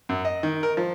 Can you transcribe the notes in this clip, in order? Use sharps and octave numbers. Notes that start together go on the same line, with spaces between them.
F#2
D#5
D#3
A#4
F3